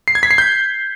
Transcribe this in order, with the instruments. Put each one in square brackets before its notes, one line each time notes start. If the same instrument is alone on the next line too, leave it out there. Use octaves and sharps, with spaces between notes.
[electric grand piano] C7
G#6
B6
C7
G6